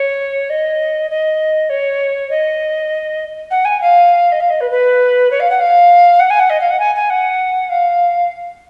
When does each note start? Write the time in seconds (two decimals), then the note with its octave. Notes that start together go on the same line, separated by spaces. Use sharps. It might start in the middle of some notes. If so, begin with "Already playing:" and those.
Already playing: C#5
0.49 D#5
1.10 D#5
1.69 C#5
2.30 D#5
3.50 F#5
3.65 G#5
3.80 F5
4.32 D#5
4.40 F5
4.50 D#5
4.60 B4
4.70 B4
5.30 C#5
5.40 F5
5.50 F#5
5.59 F5
6.19 F#5
6.30 G#5
6.39 F#5
6.49 D#5
6.60 F5
6.70 F#5
6.79 G#5
6.95 G#5
7.09 F#5
7.69 F5